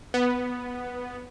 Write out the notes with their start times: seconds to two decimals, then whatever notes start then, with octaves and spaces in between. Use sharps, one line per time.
0.14 B3